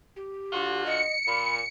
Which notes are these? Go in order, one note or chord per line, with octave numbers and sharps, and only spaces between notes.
G4
D3 F4 F#4
D#5 C#7
A#2 B5